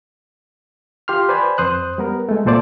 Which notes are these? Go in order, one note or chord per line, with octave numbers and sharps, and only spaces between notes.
F4 G4 C6 F6
B4 C5 D5 G#5 B5
F2 C5 D#6 F#6
G3 B3 A#4
G#3 A3
C2 A#2 A4 C5 D5 A5